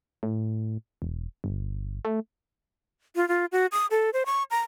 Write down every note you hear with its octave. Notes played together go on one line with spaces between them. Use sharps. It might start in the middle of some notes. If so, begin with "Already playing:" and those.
A2
E1
G1
A3
F4
F4
F#4
D#6
A4
C5
C#6
A#5